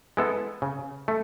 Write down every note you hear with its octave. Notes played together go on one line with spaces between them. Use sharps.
G#3 B3 E4 A4
C#3
A3